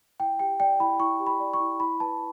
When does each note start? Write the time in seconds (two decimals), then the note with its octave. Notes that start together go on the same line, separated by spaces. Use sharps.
0.20 E4 G5
0.39 G4 G5
0.60 D5 G5
0.80 E4 B5
1.00 E4 C#6
1.20 G4
1.27 B5
1.40 D5
1.54 C#6
1.60 E4
1.80 E4 B5
2.00 B4 A5